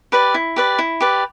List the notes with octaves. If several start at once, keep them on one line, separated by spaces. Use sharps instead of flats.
G4 B4 D5
E4
G4 B4 D5
E4
G4 B4 D5